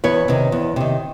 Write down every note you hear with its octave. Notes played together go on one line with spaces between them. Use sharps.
E2 B4 C#5
C3 D#3
E2
C3 D#3